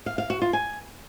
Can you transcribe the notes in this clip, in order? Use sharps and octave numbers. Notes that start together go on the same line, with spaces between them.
F5
F5
F#4
F4
G#5